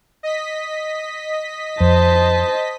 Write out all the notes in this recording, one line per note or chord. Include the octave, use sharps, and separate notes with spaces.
D#5 B6
F2 C5 A5